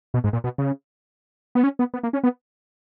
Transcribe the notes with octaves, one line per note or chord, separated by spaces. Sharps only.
B2
G#2
A#2
B2
C#3
B3
C#4
B3
B3
A#3
C#4
B3